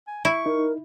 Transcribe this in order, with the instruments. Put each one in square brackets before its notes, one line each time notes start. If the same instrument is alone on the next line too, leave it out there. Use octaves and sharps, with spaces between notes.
[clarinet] G#5
[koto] E4 [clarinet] C#6
[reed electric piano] D#4 [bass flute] A#4